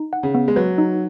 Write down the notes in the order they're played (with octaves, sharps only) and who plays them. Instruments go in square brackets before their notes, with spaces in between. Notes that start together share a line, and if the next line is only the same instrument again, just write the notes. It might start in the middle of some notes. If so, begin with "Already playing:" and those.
Already playing: [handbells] D#4
F#5
[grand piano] C#3
[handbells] B3
[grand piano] G#3
[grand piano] F#3 [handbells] B4
[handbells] D#4